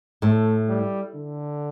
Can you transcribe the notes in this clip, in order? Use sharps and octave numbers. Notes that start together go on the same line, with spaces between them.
A2 A3
G3
D3